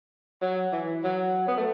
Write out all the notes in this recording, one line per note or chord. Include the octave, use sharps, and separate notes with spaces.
F#3
E3
F#3
B3
A3